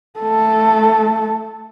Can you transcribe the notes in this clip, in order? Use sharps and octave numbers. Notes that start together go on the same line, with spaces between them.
A3 A4